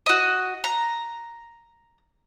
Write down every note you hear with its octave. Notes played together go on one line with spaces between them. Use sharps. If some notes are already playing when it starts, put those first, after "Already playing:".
F#4 D#5
A#5